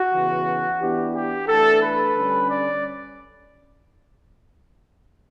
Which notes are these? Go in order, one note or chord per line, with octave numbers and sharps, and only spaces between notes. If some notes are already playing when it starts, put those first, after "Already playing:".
Already playing: F#4
C#3 E3 B3
E3 B3 D4 G4
G4
E3 A3 D4 A4
B4
D3 G3 C#4
D5